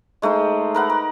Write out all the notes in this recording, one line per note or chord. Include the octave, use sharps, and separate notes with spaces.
G#3 A3 D#4 C5
A#4 B4 F#5
A#4